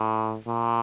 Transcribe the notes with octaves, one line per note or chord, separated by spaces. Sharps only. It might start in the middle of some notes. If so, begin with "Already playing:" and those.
Already playing: A2
A#2